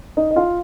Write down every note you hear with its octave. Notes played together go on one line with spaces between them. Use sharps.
D#4 D#5
D#5
F4 F5